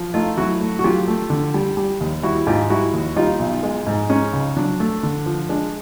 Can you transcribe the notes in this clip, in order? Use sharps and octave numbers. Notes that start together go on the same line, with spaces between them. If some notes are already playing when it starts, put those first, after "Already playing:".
Already playing: F3
A3 D#4 F4
F#3 E4 F#4
A3
F#4
F#3 F4 G4
A3
D3
G3
G3
D#2
G3 E4 F#4
G#2 F4 G4
G3 E4 F#4
D#2
G3 D#4 F4
B1
G#3
G#2
G#3 C#4 D#4
C#2
F#3 D4
A3
D3
F3
G#3 D4